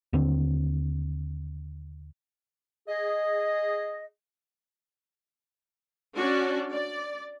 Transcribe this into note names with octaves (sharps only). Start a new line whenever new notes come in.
D#2 D3 C4
G#4 D#5
C#4 D4 F#4 D5
D5